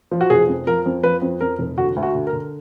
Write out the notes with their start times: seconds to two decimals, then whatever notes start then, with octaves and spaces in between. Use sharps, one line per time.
0.11 F3
0.21 F#4
0.30 F1 G#4
0.48 F2
0.67 F3 A#4
0.86 F2
1.03 F3 B4
1.22 F2
1.41 F2 A#4
1.59 F1
1.78 D3 F#4
1.96 D2
2.03 F#4
2.15 D3
2.27 A#4
2.33 D3